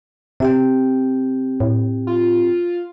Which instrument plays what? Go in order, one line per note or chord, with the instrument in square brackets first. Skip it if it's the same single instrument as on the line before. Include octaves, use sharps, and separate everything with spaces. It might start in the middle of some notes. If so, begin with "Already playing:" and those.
[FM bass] C3 [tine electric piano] C4 G4 G5
[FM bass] A2
[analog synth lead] F4